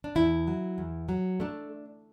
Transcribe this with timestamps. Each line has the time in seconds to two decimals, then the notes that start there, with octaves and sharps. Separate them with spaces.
0.04 D4
0.15 E2 E4
0.47 F#3
0.78 E2
1.09 F#3
1.40 A3 D4